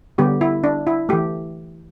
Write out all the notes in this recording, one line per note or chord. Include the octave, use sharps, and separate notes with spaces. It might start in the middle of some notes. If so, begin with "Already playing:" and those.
D3 G3 B3 G4
E4
D4
E4
E3 A3 G4